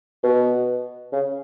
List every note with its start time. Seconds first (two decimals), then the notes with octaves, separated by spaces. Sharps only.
0.24 B2
1.12 C#3